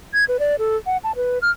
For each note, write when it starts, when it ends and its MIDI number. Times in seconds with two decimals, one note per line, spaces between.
0.14 0.24 92
0.28 0.37 71
0.40 0.56 74
0.59 0.76 69
0.86 0.97 78
1.04 1.16 81
1.16 1.39 71
1.42 1.50 89